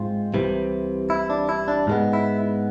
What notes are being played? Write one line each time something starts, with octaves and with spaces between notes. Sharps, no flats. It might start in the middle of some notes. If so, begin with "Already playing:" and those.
Already playing: G#2 G#3 C4 F4
C2 C3 E3
E4
D4
E4
D4
G#2 G#3 B3
E4